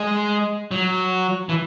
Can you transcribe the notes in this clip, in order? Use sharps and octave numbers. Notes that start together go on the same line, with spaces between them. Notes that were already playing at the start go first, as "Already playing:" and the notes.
Already playing: G#3
F#3
E3